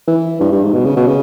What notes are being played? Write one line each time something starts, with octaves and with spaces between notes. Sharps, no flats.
E3
G2
G2
G#2
B2
C#3
B2
C#3